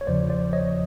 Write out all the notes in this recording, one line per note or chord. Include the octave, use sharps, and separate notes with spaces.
C#5
E2 C#3 F3 C5 D5
C5 D5
C#5 D#5